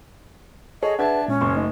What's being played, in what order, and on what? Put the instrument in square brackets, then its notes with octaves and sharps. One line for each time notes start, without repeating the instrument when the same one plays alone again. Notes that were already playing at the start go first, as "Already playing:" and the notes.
[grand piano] G#4 A4 C#5 [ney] D#5
[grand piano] D4 E5 G#6 [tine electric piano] G#4 B4 F#5 [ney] A5
[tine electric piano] A#2 G#3 [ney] C#4
[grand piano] F#1 C6 C#6
[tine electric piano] A3 D#4 D#5